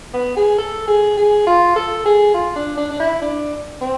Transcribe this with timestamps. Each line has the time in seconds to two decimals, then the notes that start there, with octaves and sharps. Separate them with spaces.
0.14 B3
0.36 G#4
0.58 A4
0.88 G#4
1.17 G#4
1.47 F4
1.76 A4
2.05 G#4
2.34 F4
2.56 D4
2.77 D4
2.91 D4
3.00 E4
3.22 D4
3.81 C4